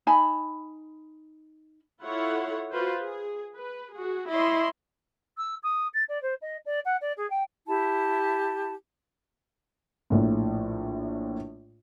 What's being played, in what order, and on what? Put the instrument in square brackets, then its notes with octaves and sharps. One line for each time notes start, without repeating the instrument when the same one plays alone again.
[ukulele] D#4 G#5 A5 B5
[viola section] E4 F4 A4 C#5 F#5
F4 F#4 B4 C5
G#4
B4
F#4 G#4
E4 C#5 D#5 C6
[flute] E6
D#6
A6
D5
C5
D#5
D5
F#5
D5
G#4
G5
[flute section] E4 G4 A5
[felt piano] A#1 A2